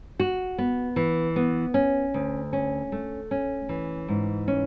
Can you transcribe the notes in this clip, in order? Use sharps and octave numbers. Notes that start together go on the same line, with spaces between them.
F#4
B3
E3
B3
C#4
D2
C#4
A3
C#4
E3
G#2
C#4